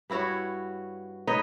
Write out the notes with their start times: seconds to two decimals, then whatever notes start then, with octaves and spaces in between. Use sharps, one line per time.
0.10 G2 E4 F#4 C#5
1.27 D#4 B4 C#5 D#5